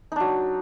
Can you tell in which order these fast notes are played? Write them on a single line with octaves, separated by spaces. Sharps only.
D#4 D4 F#3